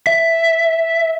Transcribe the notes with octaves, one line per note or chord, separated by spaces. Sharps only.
E5